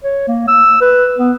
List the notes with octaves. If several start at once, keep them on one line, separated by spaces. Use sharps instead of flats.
C#5
A#3
E6
B4
B3